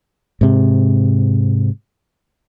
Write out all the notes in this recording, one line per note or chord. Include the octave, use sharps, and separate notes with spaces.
G#2 C3